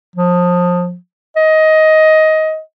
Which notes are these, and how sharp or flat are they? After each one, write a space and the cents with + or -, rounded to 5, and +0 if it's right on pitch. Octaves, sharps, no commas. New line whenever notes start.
F3 +25
D#5 +15